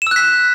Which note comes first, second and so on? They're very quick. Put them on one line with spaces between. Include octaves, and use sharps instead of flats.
E7 E6 F#6 B6